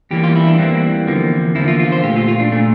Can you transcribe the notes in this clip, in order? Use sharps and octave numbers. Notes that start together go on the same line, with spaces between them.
E2 E3 G3 A#3 G4
F4
E4
D4
E2 E3 G3 A#3 C4
E2 D3 F3 A#3
E2 D3 F3 A#3 E4
F4
F4
C5
A#2 A3 G4
F4
F4
D4
A#2 A3 D4